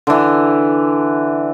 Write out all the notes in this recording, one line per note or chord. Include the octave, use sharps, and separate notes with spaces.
D3 E3